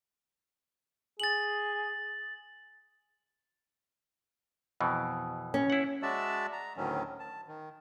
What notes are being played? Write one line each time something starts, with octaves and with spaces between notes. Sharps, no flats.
G#4 A6 F#7
F2 B2 E3
C#4
E4 F#5
G#3 F#4 D5 E5 A5 E6
A#5
D2 A2 D#3 F#3 C#4
A5
D#3